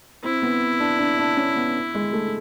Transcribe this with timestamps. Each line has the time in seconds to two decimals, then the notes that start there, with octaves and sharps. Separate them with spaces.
0.24 C4 E4
0.42 B3
0.80 D4
0.99 D4
1.19 D4
1.37 C#4
1.56 B3
1.94 G#3
2.13 A3